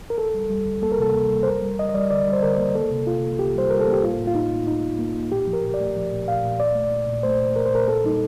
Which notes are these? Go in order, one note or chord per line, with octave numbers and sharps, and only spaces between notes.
A#4
D2 A4
G3
G3
D2
A#3 A4
A#4
C3 A4
A#3
G3
C5
F2 A#4
G3
G3 D#5
D#5
G3 D5
D3 D5
G3
C5
D3 A#4
A#3
A#3 A4
C3
A#3 F4
C2
C2 G4
G3 C5
G3 A#4
A4
A#3
G4
A2 F4
A2
F4
A2 D#4
A2
A2 D#4
A2
A#3
A2
A#2 G4
F3
A#4
A#2
D5
A3
F3
A#2
A#2 F5
A#2
A#2 D5
A3
A#2
A#2
A3 C5
A#2
A#2 A#4
C5
A#2 A#4
A#3 A4
G3 D#4